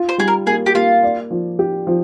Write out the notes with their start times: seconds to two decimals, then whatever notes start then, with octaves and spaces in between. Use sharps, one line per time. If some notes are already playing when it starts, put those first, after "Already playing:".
Already playing: F4
0.09 C5
0.18 G3 G#4
0.28 A#4
0.46 A#3 G#4
0.66 G4
0.75 A#3 F4
1.03 D5
1.30 F3
1.59 G4
1.87 F3